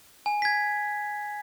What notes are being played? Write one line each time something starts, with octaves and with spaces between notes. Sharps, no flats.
G#5
G#6 B6